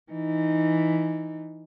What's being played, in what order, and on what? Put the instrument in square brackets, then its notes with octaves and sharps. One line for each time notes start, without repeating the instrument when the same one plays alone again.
[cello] E3 D#4